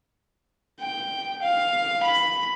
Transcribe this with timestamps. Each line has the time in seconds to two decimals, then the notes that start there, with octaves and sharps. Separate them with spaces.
0.80 G5
1.42 F5
2.03 B5